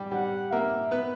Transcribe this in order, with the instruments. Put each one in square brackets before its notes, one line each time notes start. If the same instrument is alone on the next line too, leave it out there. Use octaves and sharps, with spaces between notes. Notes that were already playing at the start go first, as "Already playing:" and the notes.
Already playing: [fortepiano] G3 G4
[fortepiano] G3 G4 [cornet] F#5
[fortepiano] A#3 A#4 [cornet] E5
[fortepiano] B3 B4